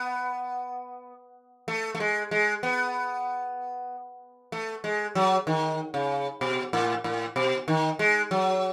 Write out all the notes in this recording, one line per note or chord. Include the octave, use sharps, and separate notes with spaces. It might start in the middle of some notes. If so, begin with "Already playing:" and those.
Already playing: B3
A3
A3
G#3
G#3
B3
A3
G#3
F#3
D#3
C#3
B2
A2
A2
B2
D#3
G#3
F#3